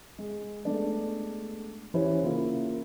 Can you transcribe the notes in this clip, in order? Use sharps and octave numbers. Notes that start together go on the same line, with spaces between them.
G#3
G#3 A3 B3 D4 D5
E3 C#4 E4 G4 C5 C#5
C#3 A#3 E4 F4